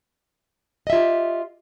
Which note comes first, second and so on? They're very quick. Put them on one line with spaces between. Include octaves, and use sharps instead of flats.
D#5 E5 F4 G4